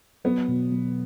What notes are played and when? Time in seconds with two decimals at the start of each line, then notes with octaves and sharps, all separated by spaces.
0.24 F#3 B3
0.48 B2
0.71 F#3